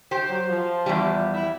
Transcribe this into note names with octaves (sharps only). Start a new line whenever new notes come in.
G4 C5
F#3
F3
E2 G3
E4